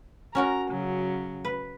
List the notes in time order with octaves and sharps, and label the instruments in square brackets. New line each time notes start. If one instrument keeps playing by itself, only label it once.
[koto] C#4 F#4 A#4 [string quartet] A#5
[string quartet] C#3 F#3
[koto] B4